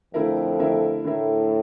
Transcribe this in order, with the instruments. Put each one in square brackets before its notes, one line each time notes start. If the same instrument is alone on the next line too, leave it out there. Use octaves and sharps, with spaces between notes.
[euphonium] F2 [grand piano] D3 A3 E4 A#4 E5
[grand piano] D3 A3 E4 A#4 E5
[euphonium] A2 [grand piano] D3 A3 E4 A#4 E5